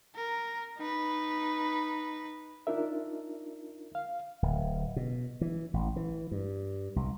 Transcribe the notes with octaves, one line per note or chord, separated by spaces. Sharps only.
A#4
D#4 B4
D4 D#4 F4 A#4 E5
F5
D1
B2
E3
A1
E3
G2
C2